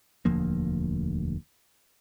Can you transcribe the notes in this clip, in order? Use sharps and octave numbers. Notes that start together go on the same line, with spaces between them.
E1 D2 F3 A#3